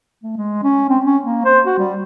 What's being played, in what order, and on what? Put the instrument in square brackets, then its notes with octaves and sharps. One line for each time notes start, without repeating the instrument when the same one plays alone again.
[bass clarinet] A3
G#3
C#4
C4
C#4
A#3
C5
F#4
G3